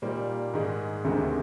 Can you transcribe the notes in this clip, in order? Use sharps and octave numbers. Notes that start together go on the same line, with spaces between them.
A#2 G3 A#3 D#4
G#2 D#3 G#3
D2 C3 D#3 G#3 C4